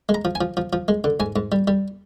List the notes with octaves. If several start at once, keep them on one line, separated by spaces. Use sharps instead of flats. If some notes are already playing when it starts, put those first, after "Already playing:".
G#3
A#5
F3
G#5
F3
F3
F3
G#3
D3
G#2 G#5
G#2
G3
G3